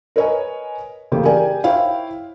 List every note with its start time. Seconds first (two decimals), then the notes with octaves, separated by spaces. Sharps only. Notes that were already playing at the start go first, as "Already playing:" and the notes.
0.16 A#4 B4 C#5 D#5 G#5
1.12 C#3 E3 A3 A#3 G4
1.25 G4 G#4 A#4 D5 G5 G#5
1.64 E4 C5 C#5 F5 G5